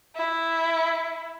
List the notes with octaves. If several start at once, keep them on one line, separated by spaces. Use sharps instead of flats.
E4